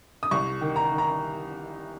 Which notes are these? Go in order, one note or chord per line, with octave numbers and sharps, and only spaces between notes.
D#6
C2 C#6
D#3
A#5
D#3
A#5